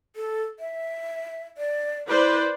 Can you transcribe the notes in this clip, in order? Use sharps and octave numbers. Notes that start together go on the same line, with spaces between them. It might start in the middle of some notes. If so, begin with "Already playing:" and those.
A4
E5
D5
E4 B4 C5 D5